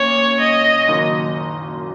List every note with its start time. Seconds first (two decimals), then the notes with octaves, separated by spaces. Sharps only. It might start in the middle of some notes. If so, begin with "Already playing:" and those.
Already playing: A#2 C#4 C#5
0.40 D#5
0.88 F#1 F#2 D#3 A#3